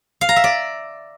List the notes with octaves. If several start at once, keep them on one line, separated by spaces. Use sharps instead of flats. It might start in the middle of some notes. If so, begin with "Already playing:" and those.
F5
A#5
E5
D5